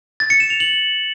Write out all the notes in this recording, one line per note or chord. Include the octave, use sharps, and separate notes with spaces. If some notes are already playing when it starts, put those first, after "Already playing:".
A6
C#7
E7
F7
F#7